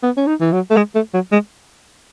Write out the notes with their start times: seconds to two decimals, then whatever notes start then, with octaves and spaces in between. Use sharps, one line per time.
0.03 B3
0.17 C#4
0.27 D#4
0.41 E3
0.53 F#3
0.70 A3
0.77 G#3
0.95 A3
1.14 F#3
1.32 G#3